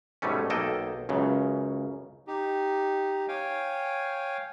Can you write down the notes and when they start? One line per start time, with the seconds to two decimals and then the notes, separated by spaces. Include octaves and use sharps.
0.22 G#2 B2 G3 A3 C#4
0.50 B1 A#3 A4 D#5 G5
1.09 C#2 F#2 C#3
2.27 D#4 G4
3.28 C#5 F5 G5 G#5